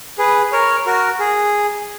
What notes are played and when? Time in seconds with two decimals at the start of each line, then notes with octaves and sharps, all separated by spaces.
0.18 G#4 B4
0.52 A#4 C#5
0.86 F#4 A#4
1.19 G#4